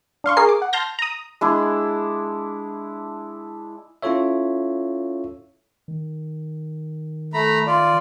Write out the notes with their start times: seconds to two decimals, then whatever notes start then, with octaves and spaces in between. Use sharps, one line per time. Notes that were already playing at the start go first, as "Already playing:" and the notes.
0.24 D4 F5 C6 C#6
0.37 G#4 A#4 C7
0.49 D6
0.62 F#5
0.73 A5 C6 F6 G6 A#6
0.99 A#5 D#6
1.41 G#3 D4 E4
4.03 C#4 E4 F4 A4 C#5 E5
5.88 D#3
7.34 A3 A#5 B5
7.67 F4 D5